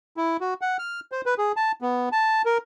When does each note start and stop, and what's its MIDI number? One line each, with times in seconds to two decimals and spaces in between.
0.17 0.37 64
0.41 0.54 66
0.61 0.77 78
0.79 1.00 89
1.12 1.21 72
1.26 1.34 71
1.38 1.52 68
1.57 1.72 81
1.82 2.09 59
2.12 2.42 81
2.45 2.58 70